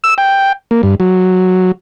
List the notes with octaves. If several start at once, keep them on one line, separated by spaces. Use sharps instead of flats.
E6
G5
A#3
G2
F#3